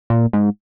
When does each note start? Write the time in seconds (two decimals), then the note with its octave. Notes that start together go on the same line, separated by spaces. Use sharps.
0.10 A#2
0.33 G#2